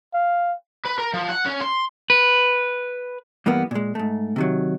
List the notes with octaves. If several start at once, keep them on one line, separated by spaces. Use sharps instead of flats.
F5
B4
A#4
F3
F#5
C#4
C6
B4
G2 E3 A#3 B3
A#2 G#3
G#2 A3
C3 D#3 F#3